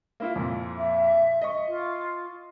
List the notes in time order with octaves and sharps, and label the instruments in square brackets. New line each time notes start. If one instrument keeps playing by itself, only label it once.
[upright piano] A#3 E4 F4
F2 A#2
[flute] E5
[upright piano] D#5 C#6
[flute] F4